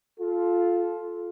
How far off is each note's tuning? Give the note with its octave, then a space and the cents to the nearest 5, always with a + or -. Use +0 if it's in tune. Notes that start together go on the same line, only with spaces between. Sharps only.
F4 +5 A4 -20